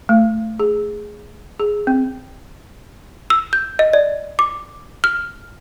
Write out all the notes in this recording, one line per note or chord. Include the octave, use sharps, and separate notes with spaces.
A3
G#4
G#4
C4
E6
G6
D#5
D5
D6
F6